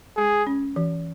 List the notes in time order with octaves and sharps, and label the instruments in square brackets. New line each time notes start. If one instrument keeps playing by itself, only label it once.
[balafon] G#3 [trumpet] G#4
[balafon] C#4
E3